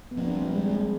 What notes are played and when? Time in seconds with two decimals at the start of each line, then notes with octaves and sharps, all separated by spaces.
0.11 B3
0.17 F3 A#3 C4 D4
0.35 G3
0.53 G#3
0.70 G#3